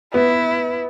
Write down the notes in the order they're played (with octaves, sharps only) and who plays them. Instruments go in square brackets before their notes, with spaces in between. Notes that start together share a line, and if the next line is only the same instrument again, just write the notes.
[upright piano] B3 [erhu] E4